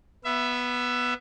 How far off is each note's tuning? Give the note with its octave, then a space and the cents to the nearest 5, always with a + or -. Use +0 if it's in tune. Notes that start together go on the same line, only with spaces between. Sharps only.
B3 -5 E5 +20